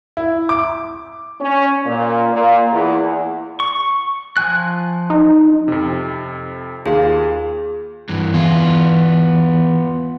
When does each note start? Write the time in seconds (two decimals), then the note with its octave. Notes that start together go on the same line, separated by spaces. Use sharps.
0.17 E4
0.49 D6
1.41 C#4
1.86 A#2
2.32 A#2
2.72 E2
3.60 C#6
4.37 F3 G#5 F#6
5.10 D#4
5.68 F2 C3
6.86 D#2 F4 G#4 F5
8.09 G2 E3
8.34 E2 B3 F4